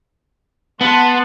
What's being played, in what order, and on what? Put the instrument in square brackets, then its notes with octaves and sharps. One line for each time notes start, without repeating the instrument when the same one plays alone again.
[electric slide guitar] B3 [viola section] F#5 A5 C6